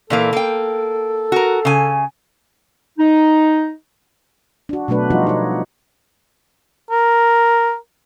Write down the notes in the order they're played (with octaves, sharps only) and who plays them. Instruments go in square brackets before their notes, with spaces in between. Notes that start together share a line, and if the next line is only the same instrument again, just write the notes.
[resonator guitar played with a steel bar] A#2 E3 A#3 [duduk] A4
[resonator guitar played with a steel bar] A#3 G5
F#4 A#4
C#3 G#5
[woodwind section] D#4
[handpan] D4 F#4
B2 F#3 A3 D4 B4
F3 G3 D#4 F4 F#4
D#4 C#5
[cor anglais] A#4